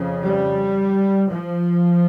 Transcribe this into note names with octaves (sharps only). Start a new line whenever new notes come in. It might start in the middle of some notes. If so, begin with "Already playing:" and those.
Already playing: F2 C#3
G3
F3